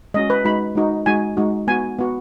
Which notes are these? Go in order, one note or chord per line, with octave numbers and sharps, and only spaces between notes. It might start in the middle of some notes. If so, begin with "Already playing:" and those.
G#3 C#4 F#4 D#5
B4
G#3 D#4 F#4 B5
G#3 D#4 F#4
G#3 D#4 F#4 G#5
G#3 D#4 F#4
B3 F#4 G#5
B3 F#4